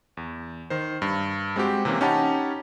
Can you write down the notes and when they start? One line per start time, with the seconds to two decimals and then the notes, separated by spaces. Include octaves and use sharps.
0.17 E2
0.70 D#3 C5
1.02 G2
1.56 G#3 C4 F#4 G4
1.85 C3 E3 A#3 C#4
2.01 C#4 D#4 G4 F#5 A5 B5